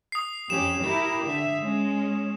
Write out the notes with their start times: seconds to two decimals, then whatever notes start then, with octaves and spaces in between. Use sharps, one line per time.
0.12 D#6 C7
0.50 F2 C#4 G4 E7
0.83 E4 G4 A#4
1.25 D3 E5
1.61 G#3 C#4